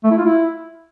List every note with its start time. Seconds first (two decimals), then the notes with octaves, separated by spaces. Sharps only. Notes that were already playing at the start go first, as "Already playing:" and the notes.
0.04 A3
0.11 E4
0.18 F4
0.25 E4